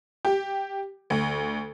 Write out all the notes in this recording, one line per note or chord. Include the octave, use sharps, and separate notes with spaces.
G4
D2